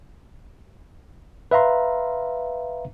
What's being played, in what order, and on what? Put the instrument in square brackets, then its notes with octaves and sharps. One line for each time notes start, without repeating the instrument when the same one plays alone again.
[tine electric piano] B4 E5 F5 A#5 C6